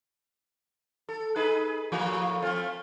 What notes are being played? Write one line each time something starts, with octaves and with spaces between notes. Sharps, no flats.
A4
D#4 G#4 B4
A2 F3 A#3
A3 C4 F4